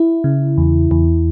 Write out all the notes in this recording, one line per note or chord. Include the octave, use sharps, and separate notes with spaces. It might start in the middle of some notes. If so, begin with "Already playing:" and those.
Already playing: E4
C#3
E2
E2